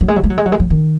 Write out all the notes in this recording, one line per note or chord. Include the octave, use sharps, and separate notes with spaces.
F#3
G#3
F#3
G#3
F#3
G#3
F#3
G#3
F#3
D#3